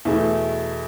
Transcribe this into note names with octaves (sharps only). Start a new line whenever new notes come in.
E2 B2 A3 E4